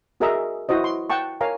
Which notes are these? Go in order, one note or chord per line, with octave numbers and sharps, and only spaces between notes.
F#4 G#4 A#4 D#5 E5 A#5
E4 F#4 C5 D#5
C6
F#5 G5 A5 C#6
A#4 C#5 F5 G#5 A#5